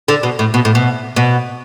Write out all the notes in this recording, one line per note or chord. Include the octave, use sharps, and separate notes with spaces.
D3
B2
A2
B2
A2
B2
B2